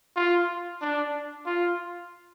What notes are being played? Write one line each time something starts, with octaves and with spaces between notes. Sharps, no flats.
F4
D4
F4